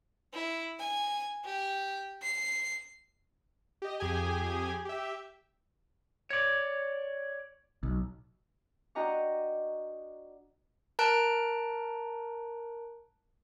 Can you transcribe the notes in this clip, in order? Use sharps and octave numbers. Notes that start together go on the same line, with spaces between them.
E4
G#5
G4
C7
G4 D#5
F2 G4 G#4 G#5
G4 E5
C#5 D5
B1
D4 F#4 D#5 G5 A#5 C#6
A#4 A5 A#5 F#6 D7